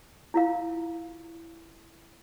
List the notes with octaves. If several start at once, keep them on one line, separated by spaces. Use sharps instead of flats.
E4 F4 F5